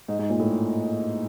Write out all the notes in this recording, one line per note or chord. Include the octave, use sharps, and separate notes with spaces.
G#2
G#2
A#2
A2